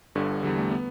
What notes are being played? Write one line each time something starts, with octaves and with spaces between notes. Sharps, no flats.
G1 G2 D3
E2 D3 G3
A3
B3